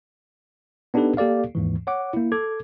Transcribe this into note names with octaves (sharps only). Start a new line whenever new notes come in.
B3 D4 D#4 G4 A4 B4
A#3 G4 A4 D5 F5
D#2 G#2 E3
C#5 F#5 D6
A#3 E4
A4 D6 G#6